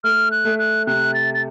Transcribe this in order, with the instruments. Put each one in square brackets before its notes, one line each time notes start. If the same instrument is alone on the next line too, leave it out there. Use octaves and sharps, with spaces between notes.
[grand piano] A3 [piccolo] F6
[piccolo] F#6
[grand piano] A3
[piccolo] F#6
[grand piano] C3 [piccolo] F#6
[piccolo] A6
A6